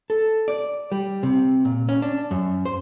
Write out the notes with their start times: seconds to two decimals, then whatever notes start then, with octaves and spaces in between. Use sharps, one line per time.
0.10 A4
0.48 D5
0.92 G3
1.23 C3
1.65 A#2
1.89 C#4
2.02 D4
2.31 F#2
2.65 C5